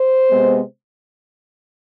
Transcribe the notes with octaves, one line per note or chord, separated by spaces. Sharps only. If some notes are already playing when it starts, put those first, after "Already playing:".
Already playing: C5
C3 G#3 B3